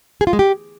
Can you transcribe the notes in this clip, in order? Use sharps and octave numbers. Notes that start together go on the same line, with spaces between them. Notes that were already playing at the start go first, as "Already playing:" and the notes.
G#4
F4
G#3
G4